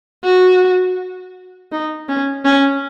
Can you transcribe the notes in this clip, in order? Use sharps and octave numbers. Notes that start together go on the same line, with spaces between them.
F#4
D#4
C#4
C#4